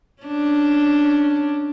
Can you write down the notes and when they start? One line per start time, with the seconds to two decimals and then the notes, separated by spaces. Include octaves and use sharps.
0.23 C#4 D4